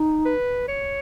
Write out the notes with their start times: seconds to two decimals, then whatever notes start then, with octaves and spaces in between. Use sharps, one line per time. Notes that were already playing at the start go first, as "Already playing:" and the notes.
Already playing: D#4
0.26 B4
0.68 C#5